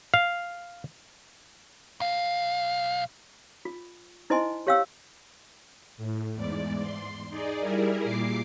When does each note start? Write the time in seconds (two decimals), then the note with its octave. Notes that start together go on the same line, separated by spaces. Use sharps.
0.14 F5
2.00 B1 F5
3.65 F4
4.30 D#4 E4 C5 D#5 G#5 C6
4.67 G4 C#5 F5 G5 E6
5.97 A2
6.35 E2 G#2 D5
6.81 C6
7.30 D#4 G#4 D5
7.60 G3 E4 G#4 A#4
8.04 A#2 D6 C7